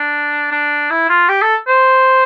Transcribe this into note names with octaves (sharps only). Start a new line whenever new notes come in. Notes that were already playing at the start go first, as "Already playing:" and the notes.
Already playing: D4
D4
E4
F4
G4
A4
C5